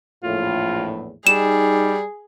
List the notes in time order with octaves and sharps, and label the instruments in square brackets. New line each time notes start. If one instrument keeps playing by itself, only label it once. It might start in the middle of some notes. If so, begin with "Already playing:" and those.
[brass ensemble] A#1 E2 A2 [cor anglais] F4
[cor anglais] G3 [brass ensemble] D#4 [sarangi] G#4 [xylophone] E7